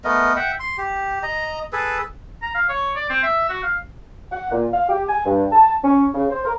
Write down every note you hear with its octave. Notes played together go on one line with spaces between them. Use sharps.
A3 B3 A#4 D#5
E5 F#5 G5
C6
G4
D#5 A#5
G#4 A4 B4
A#5
F5
C#5
D5
C4
E5
F#4
F5
F#5
A#2
F5
G4
G#5
G2
A5
C#4
C#3
C5
A#4